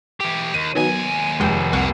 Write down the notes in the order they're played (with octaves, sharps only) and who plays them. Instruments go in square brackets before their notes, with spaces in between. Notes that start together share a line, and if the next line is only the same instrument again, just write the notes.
[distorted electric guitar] E3 G4
[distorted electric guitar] D#2 [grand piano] D#7
[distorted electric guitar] D#2 G#5 [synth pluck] D#3 F#3 B3
[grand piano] F1 [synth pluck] G#3 G5
[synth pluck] C2 F#5 C#6 [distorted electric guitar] F2 A#3